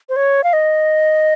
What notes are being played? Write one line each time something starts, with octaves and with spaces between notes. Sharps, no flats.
C5
C#5
F5
D#5